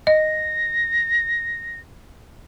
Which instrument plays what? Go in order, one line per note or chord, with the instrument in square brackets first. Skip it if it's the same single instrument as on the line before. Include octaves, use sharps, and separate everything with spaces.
[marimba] D#5 [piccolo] A#6